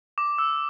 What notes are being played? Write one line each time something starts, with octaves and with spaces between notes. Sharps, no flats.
D6
E6